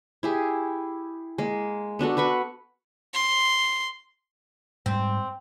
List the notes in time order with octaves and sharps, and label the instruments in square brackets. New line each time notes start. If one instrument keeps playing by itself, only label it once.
[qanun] E4 G4 G#4
G#3 A#3
B3 D4 F#4 A4
F#4 B4 B5 C#6
[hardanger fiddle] C6
[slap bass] G#2 G3 [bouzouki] C4